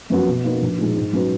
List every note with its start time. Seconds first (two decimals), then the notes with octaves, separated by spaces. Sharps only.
0.10 F#2 F3 B3 F#4
0.27 B2
0.44 A#3 D#4 F#4 B4
0.62 A#1
0.78 A#2 G#3 D#4
0.95 G#2
1.13 F#3 C#4 F#4 B4